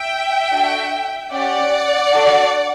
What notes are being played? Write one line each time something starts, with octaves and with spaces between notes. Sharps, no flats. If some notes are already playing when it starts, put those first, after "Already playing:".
Already playing: E5 G5
D4 F#4 A4
C#4 G4 D5 F#5
D4 F#4 A4